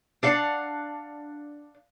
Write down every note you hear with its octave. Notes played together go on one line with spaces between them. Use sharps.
D4 F5 F#5